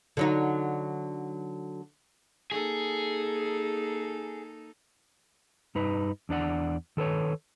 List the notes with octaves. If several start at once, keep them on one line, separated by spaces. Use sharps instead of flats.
D3 F#3 D#4
A#3 D#4 G#4 A4
G2 D#4 B4
E2 D4 D5 F#5
D#3 A4 B4 C#5